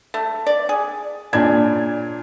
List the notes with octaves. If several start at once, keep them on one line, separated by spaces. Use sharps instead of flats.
A3
D5
G#4
A#2 C#3 D4 G#6